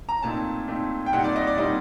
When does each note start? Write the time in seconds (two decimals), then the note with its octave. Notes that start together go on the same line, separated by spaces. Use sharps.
0.09 A#5
0.23 A#2 A3 C4 D#4 A5
0.68 A#2 A3 C4 D#4
1.06 G5
1.13 A#2 G3 C4 D#4 F#5
1.24 D5
1.36 D#5
1.47 D5
1.58 A#2 G3 C4 D#4 D#5